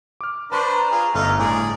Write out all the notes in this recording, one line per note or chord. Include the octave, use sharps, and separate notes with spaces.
D6 F6
D4 B4 C5 A5 C#6 D6
A#5
F4 G#4
G1 A3 D#4 F5
A2 G#4 D5